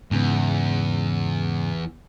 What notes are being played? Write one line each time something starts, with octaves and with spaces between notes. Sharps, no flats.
E2 G#2 C#3 B3